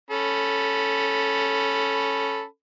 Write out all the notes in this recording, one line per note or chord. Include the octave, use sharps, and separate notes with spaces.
C#4 A4 B5